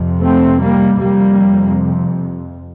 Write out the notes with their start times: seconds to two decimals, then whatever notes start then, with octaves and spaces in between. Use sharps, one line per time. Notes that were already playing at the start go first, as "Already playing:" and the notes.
Already playing: F2 C3
0.22 A3 C4
0.61 G3 A#3
0.99 F2 C3 G3 A#3